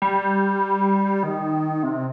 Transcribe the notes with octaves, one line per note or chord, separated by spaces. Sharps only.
G3
D#3
C3